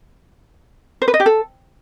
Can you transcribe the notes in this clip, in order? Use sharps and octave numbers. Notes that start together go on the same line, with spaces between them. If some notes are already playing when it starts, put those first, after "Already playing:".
C5
B4
D#5
G4
A4